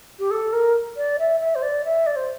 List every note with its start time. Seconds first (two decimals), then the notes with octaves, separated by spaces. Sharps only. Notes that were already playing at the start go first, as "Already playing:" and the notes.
0.19 G4
0.31 A4
0.53 A#4
0.97 D5
1.19 E5
1.40 E5
1.55 C5
1.62 D5
1.84 E5
2.06 D5
2.16 C5